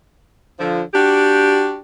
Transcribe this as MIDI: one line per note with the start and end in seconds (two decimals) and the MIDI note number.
0.60 0.82 50
0.60 0.82 53
0.94 1.79 62
0.94 1.79 66
0.94 1.79 67